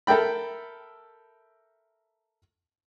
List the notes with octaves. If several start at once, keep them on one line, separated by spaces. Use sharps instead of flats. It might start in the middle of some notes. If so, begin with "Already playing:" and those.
A4 A#4 E5 G5 B5